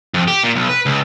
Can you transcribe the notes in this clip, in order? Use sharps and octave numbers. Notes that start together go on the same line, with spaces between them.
F2
G4
A#2
B1
B4
C#2